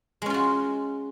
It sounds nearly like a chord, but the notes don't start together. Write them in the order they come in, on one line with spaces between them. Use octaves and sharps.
G#3 C#4 F4 F#4